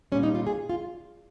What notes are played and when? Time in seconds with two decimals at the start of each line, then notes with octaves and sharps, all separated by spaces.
0.12 G3 C#4
0.15 A#2
0.23 D#4
0.35 F4
0.47 G#4
0.69 F4